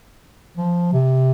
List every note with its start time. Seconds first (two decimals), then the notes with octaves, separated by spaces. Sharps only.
0.57 F3
0.93 C3